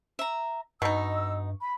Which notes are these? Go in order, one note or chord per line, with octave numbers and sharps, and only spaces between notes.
E5 A#5
G2 B2 D#4 C#6 E6
B5